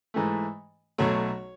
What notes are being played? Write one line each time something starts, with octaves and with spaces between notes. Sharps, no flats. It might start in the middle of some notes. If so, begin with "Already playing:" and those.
G#2 E3 A3
B1 B2 F#3 A3 C#5